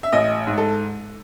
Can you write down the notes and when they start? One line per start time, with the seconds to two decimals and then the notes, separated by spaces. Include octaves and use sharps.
0.03 E5
0.12 A1 D#5
0.47 G#2
0.57 A4